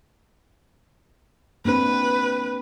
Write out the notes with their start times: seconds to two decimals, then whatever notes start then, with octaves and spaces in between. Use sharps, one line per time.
1.65 A#3 C4 D4 B4